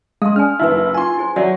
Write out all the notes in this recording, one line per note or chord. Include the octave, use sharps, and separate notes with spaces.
G#3 F5 C6 D#6
C#4 D5 G#5 F6
F#1 D#4 E4 B4
F4 G#5 C6
E4 G#4 C5
F#3 D5 E5 F#5